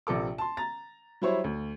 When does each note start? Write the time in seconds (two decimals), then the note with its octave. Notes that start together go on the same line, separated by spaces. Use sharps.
0.07 A#1 C3 A4 D6
0.38 A5 C6
0.57 A#5 A6
1.22 F#3 G3 E4 C5 C#5
1.44 D2